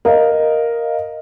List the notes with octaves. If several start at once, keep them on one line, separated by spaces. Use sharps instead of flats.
A#4 D#5 F5